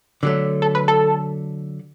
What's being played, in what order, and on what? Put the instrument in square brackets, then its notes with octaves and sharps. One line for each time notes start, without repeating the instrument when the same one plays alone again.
[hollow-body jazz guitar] D3 F#3 A3
[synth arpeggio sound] A4
B4
A4